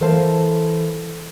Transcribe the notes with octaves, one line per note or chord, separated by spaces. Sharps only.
E3 A4 A#4 C5 F5 A5